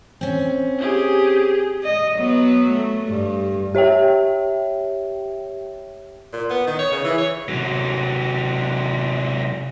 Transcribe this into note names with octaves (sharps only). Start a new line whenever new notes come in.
C4 C#4
G4 G#4
D#5
F#3 B3
A3
G2
G4 C#5 E5 G5
A#2
B3
D#3
C#5
C#3
E3
C#5
C3 F#3